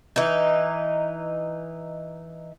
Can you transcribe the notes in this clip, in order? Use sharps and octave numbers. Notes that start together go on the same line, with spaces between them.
E3 D#4